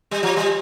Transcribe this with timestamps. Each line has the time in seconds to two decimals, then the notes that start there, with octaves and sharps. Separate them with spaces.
0.11 G3
0.23 F3
0.37 G3